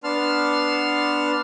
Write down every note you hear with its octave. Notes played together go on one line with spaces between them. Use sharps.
B3 D4 A5 C6 F6